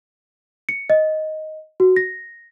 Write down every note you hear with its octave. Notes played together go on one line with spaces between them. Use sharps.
C#7
D#5
F#4
A#6